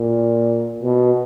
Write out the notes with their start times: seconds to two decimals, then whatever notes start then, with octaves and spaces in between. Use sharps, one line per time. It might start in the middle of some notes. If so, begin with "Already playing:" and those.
Already playing: A#2
0.82 B2